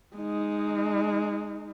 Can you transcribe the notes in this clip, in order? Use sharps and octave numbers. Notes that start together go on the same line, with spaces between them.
G#3 D#4